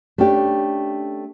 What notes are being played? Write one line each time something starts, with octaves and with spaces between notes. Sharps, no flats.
A3 C#4 D4 G4